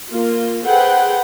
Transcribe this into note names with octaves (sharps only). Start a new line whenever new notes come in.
A#3 F4
G#4 A4 B4 C5 F#5 G5